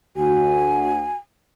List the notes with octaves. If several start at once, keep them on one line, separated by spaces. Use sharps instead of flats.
D2 F#4 G#5